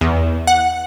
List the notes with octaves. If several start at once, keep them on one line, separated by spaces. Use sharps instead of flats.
E2
F#5